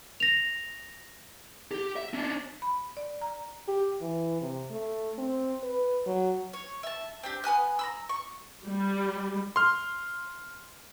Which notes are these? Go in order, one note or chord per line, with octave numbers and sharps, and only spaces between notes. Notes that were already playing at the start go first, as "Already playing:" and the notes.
A#6 F7
G4
E5
C#4 D4
B5
D5
A#5
G4
E3
C3
A3
C4
B4
F#3
C#5
E5 A5
C4 D4 G4
B3 G#5 D#6 F#6
A#5 B5 E6
C#6
G3
C6 F6